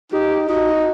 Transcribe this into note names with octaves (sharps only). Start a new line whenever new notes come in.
D#4 G4
D#4 F#4